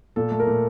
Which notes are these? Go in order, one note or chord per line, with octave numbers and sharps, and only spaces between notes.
A#2 A4
A3
A#4
A#2